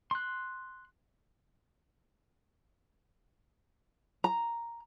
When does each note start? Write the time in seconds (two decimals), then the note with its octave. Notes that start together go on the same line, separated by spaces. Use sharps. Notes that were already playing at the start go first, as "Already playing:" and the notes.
0.11 C6 F#6
4.24 A#5